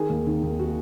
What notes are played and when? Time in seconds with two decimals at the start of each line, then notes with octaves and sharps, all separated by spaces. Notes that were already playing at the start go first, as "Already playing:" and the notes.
Already playing: D#3 G#4
0.10 D#2
0.27 D#3
0.43 D#2
0.59 F#4